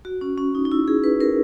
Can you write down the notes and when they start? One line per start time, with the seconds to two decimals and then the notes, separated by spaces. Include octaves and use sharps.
0.05 F#4
0.21 C#4
0.38 C#4
0.55 D#4
0.65 D#4
0.72 E4
0.88 G#4
1.04 B4
1.21 A#4